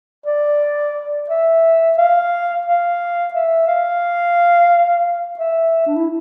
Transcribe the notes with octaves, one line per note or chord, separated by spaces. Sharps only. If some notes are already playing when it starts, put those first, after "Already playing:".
D5
E5
F5
F5
E5
F5
E5
D4
E4